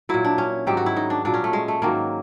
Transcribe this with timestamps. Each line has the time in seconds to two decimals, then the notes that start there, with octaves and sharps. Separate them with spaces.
0.09 A#2 F#3 E4
0.25 D4
0.38 C#4
0.67 G#2 D#3 F#3 G4
0.77 F#4
0.86 E4
0.96 D#4
1.10 D4
1.25 A#2 F#3 D4
1.34 C#4
1.44 A3
1.53 G#3
1.68 A3
1.82 G#2 D#3 F#3 A#3